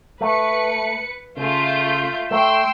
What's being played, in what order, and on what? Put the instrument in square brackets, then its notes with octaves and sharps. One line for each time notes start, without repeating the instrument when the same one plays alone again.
[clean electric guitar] A3 [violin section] B4 C#7
[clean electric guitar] C#3 [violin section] A3 F4 G6
[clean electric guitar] A3 [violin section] G5 C6 E6